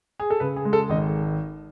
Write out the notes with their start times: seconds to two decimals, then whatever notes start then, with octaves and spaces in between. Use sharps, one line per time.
0.19 G#4
0.30 A4
0.40 C#3 B4
0.56 G#4
0.65 G#3
0.73 A4
0.90 G#1 D#5